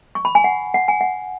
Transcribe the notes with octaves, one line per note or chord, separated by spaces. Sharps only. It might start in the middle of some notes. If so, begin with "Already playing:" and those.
C#6
B5
G#5
F#5
F#5
G#5
F#5